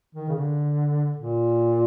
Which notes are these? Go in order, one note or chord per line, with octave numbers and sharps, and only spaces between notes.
D#3
C#3
D3
A#2